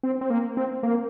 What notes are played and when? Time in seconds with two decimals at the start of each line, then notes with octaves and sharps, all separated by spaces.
0.03 C4
0.21 C4
0.30 A#3
0.57 C4
0.83 A#3